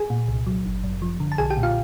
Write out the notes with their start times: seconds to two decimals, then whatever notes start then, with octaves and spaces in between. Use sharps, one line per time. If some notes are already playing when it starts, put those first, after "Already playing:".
Already playing: G#4 G#5
0.10 A#2
0.28 C2
0.47 F#3
0.65 G1
0.84 F#2
1.02 F3
1.20 D3
1.32 A5
1.38 B1 G#4 G#5
1.50 G4 G5
1.57 A#2
1.63 F4 F5